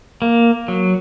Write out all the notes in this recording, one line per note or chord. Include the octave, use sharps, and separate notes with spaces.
A#3
F#3